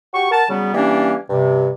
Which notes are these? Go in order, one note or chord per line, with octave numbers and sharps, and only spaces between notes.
F#4 G4 C#6
A#4 F#5 A5
C#3 F#3 G3 B3
E3 G3 A#3 C#4 D4
G2 C3